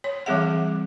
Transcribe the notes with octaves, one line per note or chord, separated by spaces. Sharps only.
C#5
E3 G3 C4 G#4 E5 F#5